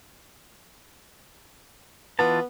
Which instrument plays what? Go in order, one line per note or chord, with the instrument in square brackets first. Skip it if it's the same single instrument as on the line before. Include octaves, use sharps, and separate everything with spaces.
[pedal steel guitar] E3 F4 A5 [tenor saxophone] B3